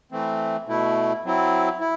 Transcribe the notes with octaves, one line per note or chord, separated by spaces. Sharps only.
E3 A3 C4
B2 A3 E4
F#3 C4 E4
E4